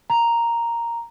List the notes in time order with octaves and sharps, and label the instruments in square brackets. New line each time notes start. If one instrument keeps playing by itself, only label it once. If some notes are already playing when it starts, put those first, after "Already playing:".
[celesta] A#5